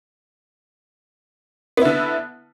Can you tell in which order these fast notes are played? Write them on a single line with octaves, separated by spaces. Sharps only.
B3 E4 D3